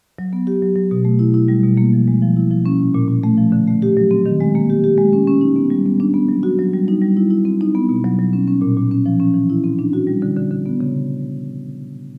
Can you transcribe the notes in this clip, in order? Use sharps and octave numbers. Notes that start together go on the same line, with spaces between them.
F#3
B3
G4
F#3
F#3
B2
A3
E4
E4
G3
B2
A#3
F3
G#3
F3
E4
F3
C#4
A#2
A#2
A#2
A3
F3
D3
A3
G4
F#3
C4
D#3
G#3
A#3
G4
G4
G#3
C#4
C#4
D#4
B3
G3
B3
D4
B3
F#3
F#4
F#3
G3
D#4
G3
E4
E4
C4
D#4
B3
B2
F#3
F#3
C#4
C#4
A#2
A#2
C#4
F3
C#4
E3
E4
C4
D4
F#4
G3
D3
D3
D3
B3
C#3